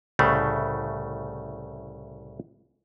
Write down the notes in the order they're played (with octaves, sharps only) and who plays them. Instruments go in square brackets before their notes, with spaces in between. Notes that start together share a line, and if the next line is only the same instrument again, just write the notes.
[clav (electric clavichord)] C2 A2 C#3 A3